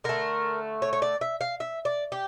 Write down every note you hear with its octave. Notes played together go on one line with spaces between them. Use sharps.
D3 A3 A#4
C#5
C#5
D5
E5
F5
E5
D5
G4